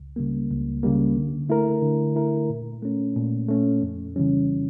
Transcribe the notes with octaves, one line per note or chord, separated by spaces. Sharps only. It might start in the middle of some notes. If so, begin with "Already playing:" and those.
Already playing: C#2
C#3 G3 A#3
C#2
C#3 G3 A#3
D3
A3 E4 A#4
D3
A3 E4 A#4
A#2
A3 C#4
A#2
A3 C#4
F2
C#3 E3 G3 C#4